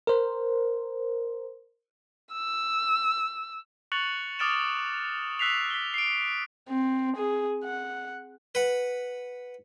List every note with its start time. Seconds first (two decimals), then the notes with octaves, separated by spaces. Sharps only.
0.07 A#4 C5
2.32 E6
3.92 C#6 F#6 A6 C#7 F7 F#7
4.39 D6 D#6 F6 A6 D7 E7
5.39 E6 F#6 B6 C7 F7
5.70 B6 G7
5.94 C7 D7
6.69 C4
7.17 G#4
7.64 F#5
8.55 B4 F#5